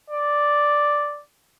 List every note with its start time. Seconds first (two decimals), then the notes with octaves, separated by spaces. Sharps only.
0.10 D5